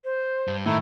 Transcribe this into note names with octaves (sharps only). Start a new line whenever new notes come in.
C5
G2
A2 D#3 A3 E4 A#5